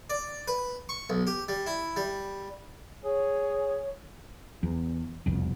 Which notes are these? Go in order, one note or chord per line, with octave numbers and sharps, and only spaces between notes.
D5
B4
C#6
B1
G4
G3
E4
G3
G#4 C#5
E2
E1 C2 F2